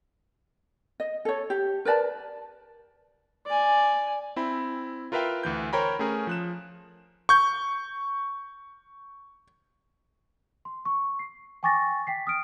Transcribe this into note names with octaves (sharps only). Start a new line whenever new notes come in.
D#5
A4 C#5
G4
A#4 B4 D5 A5
D5 G#5
C4 E4 B5
F4 A#4 B4 E5 F5 G5
D2 E3 G6
A#4 C5 C#5 G5 A#5 B5
A3 C#4 G#4 A#4
F3 F#6 E7
C#6 G6
C6
C#6
C7
G5 G#5 C#6 D6 A6 A#6
G5 B6 C7
D#6 F6 D7